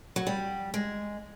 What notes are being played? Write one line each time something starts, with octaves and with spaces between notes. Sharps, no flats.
F#3
G3
G#3